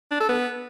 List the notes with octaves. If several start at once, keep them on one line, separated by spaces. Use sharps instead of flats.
D4
A4
B3